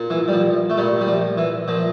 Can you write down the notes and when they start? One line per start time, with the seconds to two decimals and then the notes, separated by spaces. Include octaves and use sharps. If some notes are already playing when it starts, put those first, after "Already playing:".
Already playing: A#2
0.10 E3
0.28 G3
0.33 F3
0.70 A3
0.78 A#2 G3
1.01 G3
1.08 F3
1.38 E3
1.68 A#2 F3